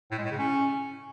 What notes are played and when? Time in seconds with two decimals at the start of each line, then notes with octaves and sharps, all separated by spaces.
0.11 A2
0.18 G#3
0.25 A2
0.32 C#3
0.38 C#4